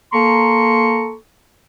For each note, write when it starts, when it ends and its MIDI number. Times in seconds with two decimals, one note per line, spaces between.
0.12 1.13 58
0.12 1.13 69
0.12 1.13 82
0.12 1.13 84
0.12 1.13 85